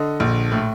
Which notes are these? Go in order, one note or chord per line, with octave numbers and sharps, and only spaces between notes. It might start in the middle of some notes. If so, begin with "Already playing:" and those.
Already playing: D3 D#5
A#1
A2